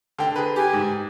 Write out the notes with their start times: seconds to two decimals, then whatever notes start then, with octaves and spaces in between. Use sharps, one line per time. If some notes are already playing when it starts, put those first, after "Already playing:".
0.19 D3 G5
0.36 G#4 B4
0.56 G4 G#5
0.73 G#2